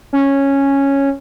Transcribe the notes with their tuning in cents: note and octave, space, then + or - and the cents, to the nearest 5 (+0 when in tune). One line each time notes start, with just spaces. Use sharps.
C#4 -5